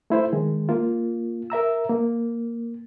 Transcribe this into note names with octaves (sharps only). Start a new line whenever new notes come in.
A3 E4 C5
D#3 G#3
A#3 F4
A#4 E5 A#5 E6
A#3